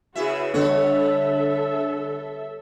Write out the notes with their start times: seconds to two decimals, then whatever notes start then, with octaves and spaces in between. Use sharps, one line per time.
0.16 C#3 E4 F#4 G#4 B4 E5
0.54 D3 G3 B3 A4 C#5 E5